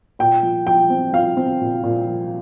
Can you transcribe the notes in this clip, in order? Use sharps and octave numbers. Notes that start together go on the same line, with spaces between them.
A#2 G5
F3
F3 G5
C4
F3 F5
C4
A#2
A#2
F3